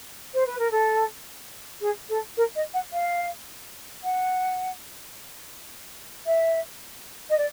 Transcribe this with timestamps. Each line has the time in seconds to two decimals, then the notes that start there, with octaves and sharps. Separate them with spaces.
0.33 C5
0.46 B4
0.58 A#4
0.70 A4
1.80 G#4
2.09 A4
2.37 A#4
2.55 D#5
2.73 F#5
2.92 F5
4.03 F#5
6.25 E5
7.29 D#5
7.37 D5